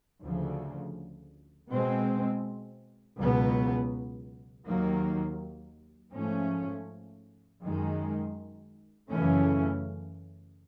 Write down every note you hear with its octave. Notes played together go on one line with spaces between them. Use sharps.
D2 C#3 F3
B2 G#3 C4
C#2 B2 F#3 B3
D#2 D#3 F#3 A#3
G#2 F3 A3 C#4
F#2 D#3 G#3
F#2 C#3 E3 A3 C#4